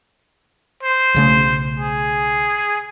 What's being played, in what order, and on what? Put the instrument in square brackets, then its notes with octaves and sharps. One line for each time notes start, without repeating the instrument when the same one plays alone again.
[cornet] C5
[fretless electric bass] B1 C#3 A3
[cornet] G#4